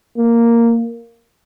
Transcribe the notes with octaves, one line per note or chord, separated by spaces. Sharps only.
A#3